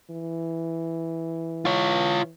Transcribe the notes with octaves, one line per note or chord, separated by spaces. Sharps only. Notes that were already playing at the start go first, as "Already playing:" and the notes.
E3
F4 C#5